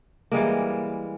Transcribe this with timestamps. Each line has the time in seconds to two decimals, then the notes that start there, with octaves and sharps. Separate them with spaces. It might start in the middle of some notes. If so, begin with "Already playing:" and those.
0.32 E3 G3 G#3 A#3